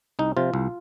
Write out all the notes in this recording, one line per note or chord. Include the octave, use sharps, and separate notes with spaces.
C2 D#4
C3 F3 F4
C2